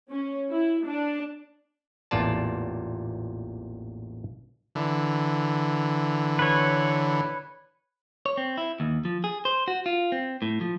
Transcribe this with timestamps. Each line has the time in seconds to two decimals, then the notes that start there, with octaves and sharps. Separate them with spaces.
0.12 C#4
0.50 E4
0.84 D4
2.11 A1 E2 A#2 F4 D5 A5
4.75 D3 E3
6.39 B4 C#5
8.26 C#5
8.37 C4
8.58 E4
8.80 D#2
9.05 F3
9.24 G#4
9.45 C5
9.68 F#4
9.86 F4
10.12 C4
10.42 A2
10.61 F3